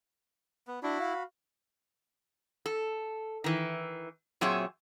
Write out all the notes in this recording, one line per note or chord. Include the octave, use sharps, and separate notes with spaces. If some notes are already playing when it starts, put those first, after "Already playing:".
B3
D4 E4 F#4 B5
F5
A4
D#3 E3
A#2 F#3 C4 G#4 C#5 E5